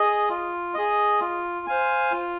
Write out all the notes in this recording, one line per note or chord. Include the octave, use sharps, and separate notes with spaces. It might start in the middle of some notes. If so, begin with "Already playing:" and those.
Already playing: G#4 D#5
F4
G#4 D#5
F4
C5 F5 G#5
F4